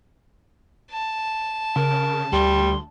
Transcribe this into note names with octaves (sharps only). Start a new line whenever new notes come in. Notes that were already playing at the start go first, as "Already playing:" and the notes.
A5
C#3 A#4
D2 G3 C6